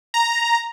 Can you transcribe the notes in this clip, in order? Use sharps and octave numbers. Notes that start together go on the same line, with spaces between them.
A#5